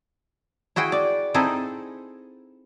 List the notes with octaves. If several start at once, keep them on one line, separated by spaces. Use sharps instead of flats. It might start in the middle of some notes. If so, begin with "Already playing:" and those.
E4 F#4 G#4 G5
D5
C4 D#4 E4 G#4 A4